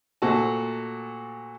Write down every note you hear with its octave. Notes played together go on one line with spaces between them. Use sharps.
A#2 A3 F#4 C5 A5